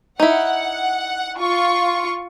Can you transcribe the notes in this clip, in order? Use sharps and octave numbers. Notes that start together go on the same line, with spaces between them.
D#4 E4 F#5
F4 C#6